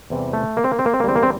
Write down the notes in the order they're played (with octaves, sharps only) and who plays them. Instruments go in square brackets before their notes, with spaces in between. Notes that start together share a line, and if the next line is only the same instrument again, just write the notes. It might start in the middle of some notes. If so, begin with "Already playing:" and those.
[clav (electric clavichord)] E2 C3 E3 G3
A3
A#3
C4
A#3
C4
A#3
C4
A#3
E2 D3 G3 C4
A#3
C4